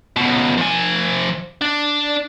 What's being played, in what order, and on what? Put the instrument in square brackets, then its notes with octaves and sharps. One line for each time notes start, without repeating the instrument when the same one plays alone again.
[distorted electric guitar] C#2 B2
F3 G#5
D4